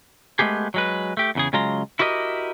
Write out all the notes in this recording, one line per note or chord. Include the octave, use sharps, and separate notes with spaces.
G#3 A3 B3 G4 G#4
F#3 G#3 B4
A3 G4
E2 C#3 G#4
C#3 F#3 G#3 F4 A#5 C6
E4 F#4 G4 A#4 D#5